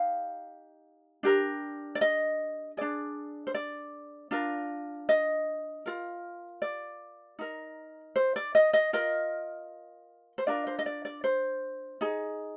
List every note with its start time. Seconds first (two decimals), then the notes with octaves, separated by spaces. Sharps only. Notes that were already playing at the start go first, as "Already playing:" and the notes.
Already playing: D#4 G4 F5
1.23 D4 G4 A#4
1.95 D5
2.01 D#5
2.77 D4 G#4 D5
3.47 C5
3.54 D5
4.31 D4 F4 A#4
5.09 D#5
5.86 F4 A#4
6.62 D5
7.39 D#4 A#4
8.16 C5
8.36 D5
8.55 D#5
8.73 D#5
8.93 F4 A#4 D#5
10.38 C5
10.47 D4 F4 A#4 D5
10.67 C5
10.79 D#5
10.86 D5
11.05 D5
11.24 C5
12.01 D#4 G#4